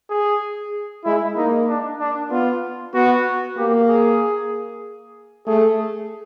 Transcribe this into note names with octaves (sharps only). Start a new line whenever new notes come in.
G#4
G#3 E4
A#3 D#4
D4
D4
B3 F4
B3 F#4
A#3 G4
G#4
A3 G#4